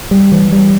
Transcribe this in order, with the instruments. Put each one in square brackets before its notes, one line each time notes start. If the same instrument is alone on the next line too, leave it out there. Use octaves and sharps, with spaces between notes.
[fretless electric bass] G3
E3
G3